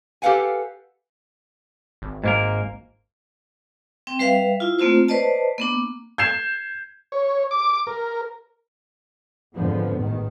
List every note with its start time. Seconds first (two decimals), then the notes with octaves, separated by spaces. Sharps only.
0.22 G4 A4 B4 F5 F#5 G#5
2.02 G#1
2.24 G#2 A#3 A#4
4.07 C4 G5
4.19 G3 B4 E5 F5
4.60 E4 F4
4.79 A3 A#3 C4 F4 C5
5.08 B4 C5 D5 D#5 A5
5.58 A#3 B3 D4
6.18 G6 G#6 C7 E7
7.12 C#5
7.51 D6
7.87 A#4
9.55 F2 G#2 D3 F3 B3
9.99 A1 E2 G#2 D#3